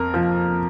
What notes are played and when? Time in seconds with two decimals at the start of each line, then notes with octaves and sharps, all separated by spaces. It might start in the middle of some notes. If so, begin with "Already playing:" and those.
Already playing: F2 A#4
0.14 F3